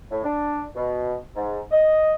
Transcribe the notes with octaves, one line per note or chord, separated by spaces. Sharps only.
A2
D4
B2
G#2
D#5